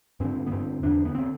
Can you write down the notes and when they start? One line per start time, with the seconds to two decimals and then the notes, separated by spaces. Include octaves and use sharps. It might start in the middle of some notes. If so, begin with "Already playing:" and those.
0.20 G2 D3 C4
0.46 B3
0.51 G2 D3 C4
0.82 E2 D3 D4
1.05 B3
1.15 D3 C4